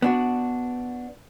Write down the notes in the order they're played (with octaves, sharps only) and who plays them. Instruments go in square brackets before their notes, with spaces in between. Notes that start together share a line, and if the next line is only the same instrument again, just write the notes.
[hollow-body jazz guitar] B3 D4 F#4